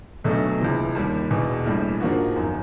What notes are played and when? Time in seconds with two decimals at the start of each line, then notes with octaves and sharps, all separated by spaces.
0.24 B1 B2 F#3 A3 D4
0.60 C#2 C3 E3
0.95 D#2 D#3 G3
1.31 E1 E2 B2
1.65 A#1 A2 E3 G3
2.01 G#2 F3 A#3 D4 F#4
2.36 G1 F#2 D#3